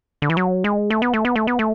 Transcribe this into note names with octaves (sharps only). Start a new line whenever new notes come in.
D3
E3
F#3
G#3
A3
B3
A3
B3
A3
B3
A3